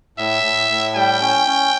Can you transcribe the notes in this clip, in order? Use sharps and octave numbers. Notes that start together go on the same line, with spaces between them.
A2 E5
A2
A2
G3 G5
C#4
C#4